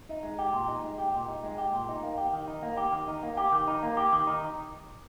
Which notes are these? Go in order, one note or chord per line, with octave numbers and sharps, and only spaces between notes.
D#4
G#3
G4
A#2
D#4
G#3
G4
A#2
D#4
G#3
G4
A#2
D#4
A#3
G4
D#3
D#4
A#3
G4
D#3
D#4
A#3
G4
D#3
D#4
A#3
G4
D#3
D#4